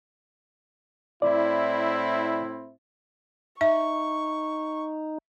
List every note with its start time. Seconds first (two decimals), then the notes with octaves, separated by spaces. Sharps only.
1.22 A2 C4 E4 D5
3.61 D#4 E5 C#6